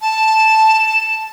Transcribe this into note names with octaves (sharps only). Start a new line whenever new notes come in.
A5